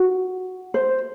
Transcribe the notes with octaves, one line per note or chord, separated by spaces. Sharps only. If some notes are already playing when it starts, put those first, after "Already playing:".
Already playing: F#4
C5